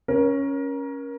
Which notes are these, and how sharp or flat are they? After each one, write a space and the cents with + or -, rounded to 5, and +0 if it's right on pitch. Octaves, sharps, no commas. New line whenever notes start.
C#4 +0 A#4 +25